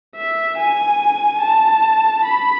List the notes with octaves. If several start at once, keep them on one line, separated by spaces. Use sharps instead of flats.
E5
G#5
A5
B5